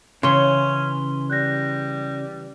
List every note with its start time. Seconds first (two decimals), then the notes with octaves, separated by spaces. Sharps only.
0.23 C#3 E3 C#4 E4 C#5 C6 G7
1.30 G3 F#6 G6 A#6